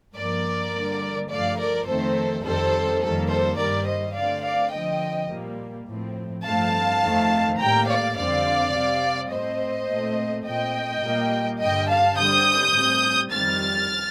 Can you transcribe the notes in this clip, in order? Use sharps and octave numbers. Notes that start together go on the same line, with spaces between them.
G2 F3 A#3 A#4 D5
D3 G3 A#3
G2 F3 A3 D5 F5
A#4 D5
F2 D#3 A3 C4 A4 C5
F2 D#3 G3 C4 A4 C5
F2 D#3 G3 A#3 A4
A4 C5
G2 D#3 G3 A#4 D5
C5 D#5
D3 A3 C4 D5 F5
D5 F5
D3 F3 C4 D#5 G5
A#2 G3 A#3
A2 F3 C4
G2 F3 A3 C4 F5 A5
F2 D#3 A3 C4
A2 G3 A#3 G5 A#5
D5 F5
F2 D3 G3 C4 D5 F5
C3 G3 C4
A2 A3 C4 C5 D#5
A#2 A3 C4
A#2 A3 C4 D#5 G5
A#2 G3 A#3
G2 D3 G3 D#5 G5
F5 A5
D3 G3 C4 D#6 G6
A2 G3 C4
F2 D#3 G3 C4 F6 A6